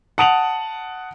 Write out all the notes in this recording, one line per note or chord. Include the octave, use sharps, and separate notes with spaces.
F#5 A5 D#6 D7 F7 F#7